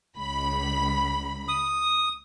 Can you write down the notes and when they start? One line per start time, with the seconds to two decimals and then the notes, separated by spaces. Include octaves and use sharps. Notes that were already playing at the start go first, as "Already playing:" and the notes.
0.16 C#2 B5
1.48 D#6